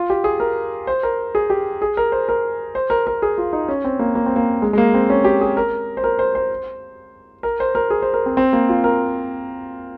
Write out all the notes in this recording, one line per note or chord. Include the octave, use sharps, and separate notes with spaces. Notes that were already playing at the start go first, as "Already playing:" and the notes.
Already playing: F4
G4
G#4
A#4
C5
A#4
G#4
G4
G#4
A#4
C5
A#4
C5
A#4
A#4
G#4
F4
D#4
C#4
C4
A#3
A#3
C4
A#3
G#3
G#3
A#3
C4
C#4
G4
G#4
A#4
C5
A#4
C5
C5
A#4
C5
A#4
G#4
C5
A#4
C4
C4
A#3
F4
A#4